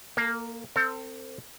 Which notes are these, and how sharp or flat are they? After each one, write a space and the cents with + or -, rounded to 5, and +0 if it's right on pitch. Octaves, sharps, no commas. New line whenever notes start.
A#3 +0 A4 +40
C4 +0 A4 +40